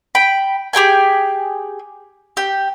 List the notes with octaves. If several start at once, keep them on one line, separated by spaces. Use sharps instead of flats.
G5 B5
G4 G#4 G5 G#5
G4